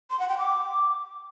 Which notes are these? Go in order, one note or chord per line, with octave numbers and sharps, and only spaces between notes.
C6
F#5
G5
D6